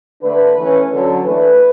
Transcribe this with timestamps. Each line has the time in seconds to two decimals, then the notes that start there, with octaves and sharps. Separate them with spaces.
0.22 D3 A3 D4 B4
0.56 E3 A3 C#4
0.90 D3 F#3 C#4 A4
1.24 E3 A3 D4 B4